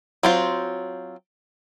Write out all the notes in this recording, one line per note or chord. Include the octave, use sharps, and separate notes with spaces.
F#3 C4 F4